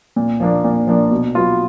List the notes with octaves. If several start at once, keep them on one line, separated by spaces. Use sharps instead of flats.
A#2
F3 A#3 D4
A#2
F3 A#3 D4
B2
F#3 B3 F4